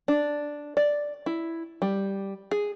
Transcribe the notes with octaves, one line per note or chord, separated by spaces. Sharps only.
D4
D5
E4
G3
G#4